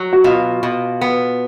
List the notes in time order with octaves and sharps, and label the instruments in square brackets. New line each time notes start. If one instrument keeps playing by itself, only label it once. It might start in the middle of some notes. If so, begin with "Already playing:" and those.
Already playing: [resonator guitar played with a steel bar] F#3
[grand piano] F#4
[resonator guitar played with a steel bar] B2 [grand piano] F4
[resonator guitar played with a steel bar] B2
B3